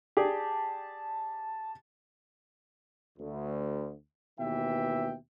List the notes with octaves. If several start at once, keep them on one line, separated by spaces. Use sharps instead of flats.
G4 G#4 D5 A5
D2
D#2 B2 E3 E5 G5